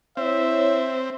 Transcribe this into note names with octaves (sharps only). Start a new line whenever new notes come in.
C4 E4 C#5 E5